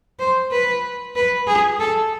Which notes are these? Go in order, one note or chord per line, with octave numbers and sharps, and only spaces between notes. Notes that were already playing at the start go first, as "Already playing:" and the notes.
C5
B4
B4
G#4
A4